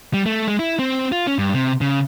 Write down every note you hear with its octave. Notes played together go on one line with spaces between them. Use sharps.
G3
A3
G#3
E4
C4
F4
C#4
G2
C3
C#3